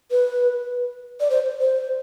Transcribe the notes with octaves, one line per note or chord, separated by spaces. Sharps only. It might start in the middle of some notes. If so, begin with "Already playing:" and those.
B4
D5
C5
C5